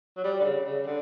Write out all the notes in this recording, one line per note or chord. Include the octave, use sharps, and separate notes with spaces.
F#3
G3
D3
C#3
C#3
D3